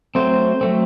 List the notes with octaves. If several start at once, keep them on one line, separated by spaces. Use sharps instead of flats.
F#3 A3 C4 C5
F#3 A3 C4